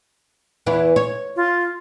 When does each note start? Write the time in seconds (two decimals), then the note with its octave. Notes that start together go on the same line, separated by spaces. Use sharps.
0.66 E2 E3 E4
0.96 C#5
1.36 F4